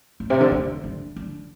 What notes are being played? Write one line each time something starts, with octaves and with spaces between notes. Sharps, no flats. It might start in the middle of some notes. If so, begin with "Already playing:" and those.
A2
C3
D3
D3
D3
D3